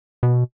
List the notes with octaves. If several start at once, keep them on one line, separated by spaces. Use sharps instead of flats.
B2